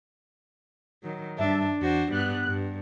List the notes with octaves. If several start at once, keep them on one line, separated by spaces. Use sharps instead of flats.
D#3 F#3
G2 D4 E5 A5
E2 D4 F#4 C5
G2 G3 B3 F#6
G2